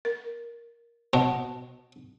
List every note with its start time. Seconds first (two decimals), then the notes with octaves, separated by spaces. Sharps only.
0.05 A#4
1.13 B2 D#5 F#5 A5